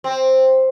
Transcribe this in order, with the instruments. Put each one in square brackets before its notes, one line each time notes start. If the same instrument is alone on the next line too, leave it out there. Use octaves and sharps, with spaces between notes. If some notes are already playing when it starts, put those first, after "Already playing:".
[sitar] C4